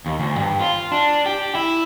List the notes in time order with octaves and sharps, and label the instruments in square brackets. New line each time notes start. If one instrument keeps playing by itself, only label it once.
[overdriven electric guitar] D#2
D2
G2
F4
D4
G4
E4